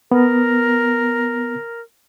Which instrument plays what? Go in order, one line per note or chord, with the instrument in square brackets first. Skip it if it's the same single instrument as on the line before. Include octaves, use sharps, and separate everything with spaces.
[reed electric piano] B3 [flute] A#4